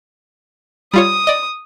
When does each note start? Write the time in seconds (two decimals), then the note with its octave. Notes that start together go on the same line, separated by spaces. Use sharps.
0.93 G3 F4 C#5 D#6
1.27 D5 D#5